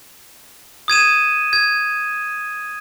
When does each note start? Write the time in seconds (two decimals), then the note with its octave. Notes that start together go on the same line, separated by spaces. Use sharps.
0.88 D#6 G#6 D#7 E7
1.53 G#6